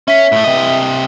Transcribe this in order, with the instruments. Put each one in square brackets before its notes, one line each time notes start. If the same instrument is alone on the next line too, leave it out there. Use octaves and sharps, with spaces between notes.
[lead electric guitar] C#4 [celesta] E5 B6
[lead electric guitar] A2 A3
C3 D#5